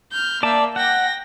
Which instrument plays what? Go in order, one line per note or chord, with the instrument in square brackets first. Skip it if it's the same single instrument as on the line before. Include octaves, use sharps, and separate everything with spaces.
[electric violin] F6 G6
[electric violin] A#3 E5 [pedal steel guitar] D5 A5
[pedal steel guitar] F#5 [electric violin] G5 A#6